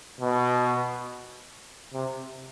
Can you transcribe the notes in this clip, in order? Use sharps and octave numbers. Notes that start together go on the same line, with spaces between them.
B2
C3